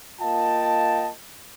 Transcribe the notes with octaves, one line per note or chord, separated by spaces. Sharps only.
A#3 F4 D#5 G5 A5